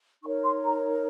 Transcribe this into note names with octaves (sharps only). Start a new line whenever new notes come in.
D#4 A#4 C#5 C#6
C6
A#5